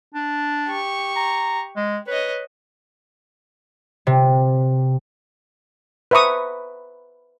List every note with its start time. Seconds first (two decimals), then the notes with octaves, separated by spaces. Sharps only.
0.15 D4
0.68 G4 C#6
1.16 A#5
1.77 G#3
2.07 B4 C#5 D#5
4.07 C3
6.11 B4 C5 E5 A#5 C#6 D#6